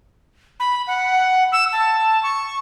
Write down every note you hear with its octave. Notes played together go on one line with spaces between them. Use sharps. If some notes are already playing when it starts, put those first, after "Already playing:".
B5
F#5
E6
A5
C#6